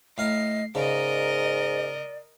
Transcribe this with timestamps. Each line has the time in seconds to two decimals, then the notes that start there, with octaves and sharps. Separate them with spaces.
0.18 A2 D#5 F5 A#5 C7
0.75 G#2 C#3 A#4 D5 D#5